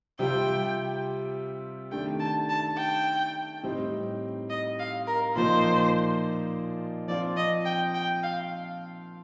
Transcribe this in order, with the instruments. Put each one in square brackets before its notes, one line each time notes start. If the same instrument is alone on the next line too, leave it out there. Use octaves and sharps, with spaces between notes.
[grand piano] C3 G3 C4 F4 [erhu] G5
[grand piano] D#3 A3 D4 G4 [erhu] G5
[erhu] A5
A5
G5
[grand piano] A2 G3 C4 D#4
[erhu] D#5
F5
A#4
[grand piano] A#2 F3 A#3 D#4 [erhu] C5
[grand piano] F3 C4 F4 [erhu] D5
[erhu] D#5
G5
G5
F5